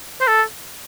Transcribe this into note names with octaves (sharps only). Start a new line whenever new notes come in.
C5
A4